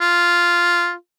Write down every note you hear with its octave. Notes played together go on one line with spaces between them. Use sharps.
F4